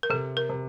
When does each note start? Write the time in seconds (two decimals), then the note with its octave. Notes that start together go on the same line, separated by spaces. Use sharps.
0.03 A#4
0.10 C3 A4
0.37 A#4
0.49 C3